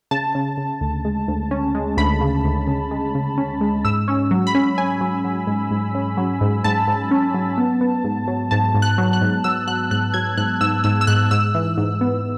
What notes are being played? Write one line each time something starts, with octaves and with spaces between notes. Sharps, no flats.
C#3 A5
C#3
C#3
D2
G#3
D2
C#4
G#3
D2 B5
C#3
D2
C#3
G#3
C#3
C#4
G#3
G#2 E6
C#4
F#3
B5
C#4
C#4 G#5
F#3
F#3
G#2
G#2
C#4
F#3
G#2
G#2 A5
G#2
C#4
F#3
B3
B3
G#2
F#3
G#2 A5
G#2
F#6
F#3
F#6
G#2
F#3 E6
F#3 F#6
G#2 F#6
F#3 G#6
G#2 F#6
G#2 E6
G#2 E6
E6
G#2 F#6
G#2 E6
E3
G#2
B3